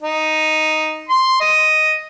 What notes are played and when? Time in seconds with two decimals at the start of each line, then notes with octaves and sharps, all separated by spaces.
0.03 D#4
1.09 C6
1.41 D#5